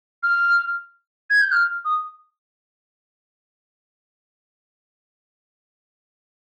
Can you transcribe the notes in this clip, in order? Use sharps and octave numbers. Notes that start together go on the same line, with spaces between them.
F6
G#6
G6
F6
D#6